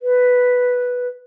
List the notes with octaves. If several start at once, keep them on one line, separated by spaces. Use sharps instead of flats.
B4